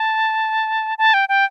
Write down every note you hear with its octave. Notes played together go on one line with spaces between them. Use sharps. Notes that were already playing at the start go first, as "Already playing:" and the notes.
Already playing: A5
A5
G5
G5